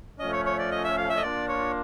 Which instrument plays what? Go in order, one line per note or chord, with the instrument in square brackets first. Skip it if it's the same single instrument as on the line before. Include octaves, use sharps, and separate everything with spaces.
[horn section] F3 A3 C#4 [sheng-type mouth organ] D#5
[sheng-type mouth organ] C#5
C#5
D5
D#5
E5
F5
E5
D#5
[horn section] A#3 D4 F4 [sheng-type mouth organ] D5
[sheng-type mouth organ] C#5